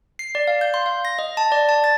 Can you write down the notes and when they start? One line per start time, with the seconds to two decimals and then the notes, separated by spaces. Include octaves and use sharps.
0.19 C7
0.35 D5
0.48 F5
0.61 G6
0.74 C6
0.86 F5
1.05 A#6
1.19 D#5
1.37 A5
1.52 D5
1.69 A5
1.84 A6